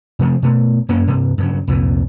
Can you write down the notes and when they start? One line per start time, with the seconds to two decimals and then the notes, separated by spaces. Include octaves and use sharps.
0.19 C3 F3 A3 C4
0.42 B2 A3
0.89 F#2 A#3 C#4
1.07 G2 C3
1.38 G2 C#3 F#3
1.67 C2 F2 A#2